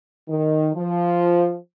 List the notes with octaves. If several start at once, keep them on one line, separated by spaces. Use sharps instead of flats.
D#3
F3